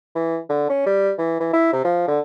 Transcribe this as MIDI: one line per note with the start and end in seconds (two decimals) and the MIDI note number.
0.15 0.38 52
0.49 0.69 50
0.69 0.82 61
0.86 1.12 55
1.18 1.37 52
1.40 1.49 52
1.53 1.70 64
1.73 1.80 48
1.84 2.04 53
2.08 2.20 50